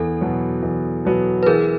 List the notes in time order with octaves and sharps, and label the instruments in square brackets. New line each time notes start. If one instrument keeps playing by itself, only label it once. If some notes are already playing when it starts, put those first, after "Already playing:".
Already playing: [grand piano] E2 [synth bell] A4
[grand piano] B2 F#3 B3
E2
B2 F#3 B3
[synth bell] B4
[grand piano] E3 [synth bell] G#4 A#4